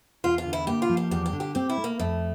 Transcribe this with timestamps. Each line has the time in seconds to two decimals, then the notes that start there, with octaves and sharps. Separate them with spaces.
0.24 E2 F4
0.38 F4
0.45 D3
0.53 E4
0.67 A#3 G4
0.82 F4
0.89 F3
0.97 G4
1.11 E2 G4
1.26 G4
1.33 D3
1.40 G4
1.55 C4 G4
1.70 E4
1.77 A3
1.84 A#3
1.99 F2 A3